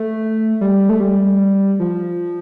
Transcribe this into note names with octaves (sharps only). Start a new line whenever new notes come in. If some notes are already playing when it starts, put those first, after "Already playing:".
Already playing: A3
G3
A3
G3
F3